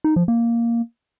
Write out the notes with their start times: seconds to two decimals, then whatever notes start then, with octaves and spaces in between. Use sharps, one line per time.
0.04 D#4
0.16 F3
0.28 A#3